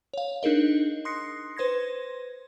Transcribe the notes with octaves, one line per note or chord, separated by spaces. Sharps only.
C#5 F5
D4 D#4 G#4 A#4 D#5
C6 D#6 F#6 A#6 C7 C#7
B4 C5 C6 G#6 A#6